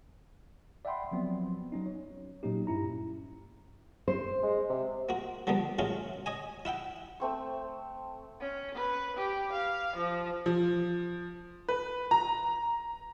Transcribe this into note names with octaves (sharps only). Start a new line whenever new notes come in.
D5 E5 F#5 G5 B5 C6
F3 F#3 B3 C4
F#3 C#4 D#4
C#5
A#2 F#3 A#3 C#4 D#4 G4
G2 C#4 E4 A#5
C5
G#3
C3
A#3 F#4
D3 F3 G3 A#3 B3
F#3 G#3 A3 C#4 F4 F#4
C#5 D#5 G#5
E4 E5 F#5 G5
A3 C4 C#6
C#4
B4
G4
F5
F3
F3
B4
A#5